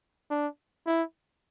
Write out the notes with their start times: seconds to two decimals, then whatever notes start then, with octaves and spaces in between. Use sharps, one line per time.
0.31 D4
0.86 E4